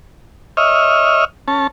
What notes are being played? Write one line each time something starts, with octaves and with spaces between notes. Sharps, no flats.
C#5 D#5 E5 F6
C#4 A5